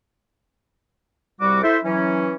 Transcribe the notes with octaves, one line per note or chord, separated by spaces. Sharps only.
C2 G3 F#4 D6
E4 A4 C5 E5
E3 F#3 C#4